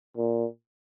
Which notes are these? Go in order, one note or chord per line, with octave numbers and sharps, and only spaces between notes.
A#2